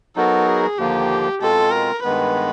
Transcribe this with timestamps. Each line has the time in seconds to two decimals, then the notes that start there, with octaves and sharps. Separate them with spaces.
0.16 F#3 B3 D#4 F#4 A4 A#4
0.47 G#4
0.78 D#2 D3 F3 A#3 G4
1.41 B2 G#3 C4 F4 A4
1.72 A#4
2.03 G2 D#3 G#3 B3 B4